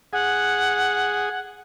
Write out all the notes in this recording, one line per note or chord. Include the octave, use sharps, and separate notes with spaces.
G#4 F#5